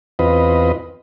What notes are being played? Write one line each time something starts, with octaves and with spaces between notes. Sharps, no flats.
E2 C4 F4 B4 D#5